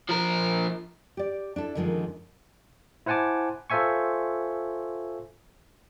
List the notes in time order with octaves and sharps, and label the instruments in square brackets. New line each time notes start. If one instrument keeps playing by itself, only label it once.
[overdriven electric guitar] F3 A#4
[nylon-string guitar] G4 D5
D4 E4 A4
F#2 D3 D#3 F3 G3 G#3
[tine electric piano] E4 C5 F#5 G#5 A5 D6
F4 A4 C5 E5 G#5 C#6